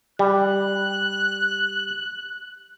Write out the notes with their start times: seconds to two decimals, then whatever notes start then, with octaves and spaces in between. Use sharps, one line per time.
0.19 G3 F#6